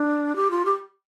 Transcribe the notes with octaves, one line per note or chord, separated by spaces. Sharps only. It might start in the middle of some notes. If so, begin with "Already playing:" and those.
Already playing: D4
G4
F4
G4